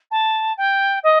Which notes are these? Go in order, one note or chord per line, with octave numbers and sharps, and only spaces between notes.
A5
G5
D#5